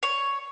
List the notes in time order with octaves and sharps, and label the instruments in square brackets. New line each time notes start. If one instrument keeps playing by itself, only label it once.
[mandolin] C#5